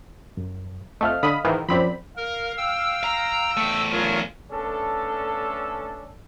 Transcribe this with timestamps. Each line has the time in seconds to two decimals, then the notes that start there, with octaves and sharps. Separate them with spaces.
0.37 F#2
1.01 F2 A3 D#5 F5 F6
1.23 D3 B5 D#6
1.44 G#2 D#3 E3
1.69 F#2 F3 C4 D5 B5
2.17 A#4 F5
2.57 G5 E6
3.04 A#5
3.57 E2 A3
3.91 F#3 C#4 F4 A#4
4.51 A3 B3 C#4 D4 A4